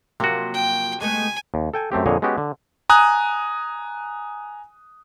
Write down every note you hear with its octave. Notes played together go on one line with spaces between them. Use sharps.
C3 F3 F#3 A#3 F#4
G5
G#3 A3 B3 G#5
D#2
A4 G5 G#5
F#2 A3 C4 G4
F2 A#2 D3 G#4 C#5 D#5
G#3 B3 C#4 F#4 G4
D3
G#5 A#5 D#6 F#6